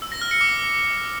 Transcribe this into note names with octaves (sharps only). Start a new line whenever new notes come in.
E6
A#6
F6
C#7
D6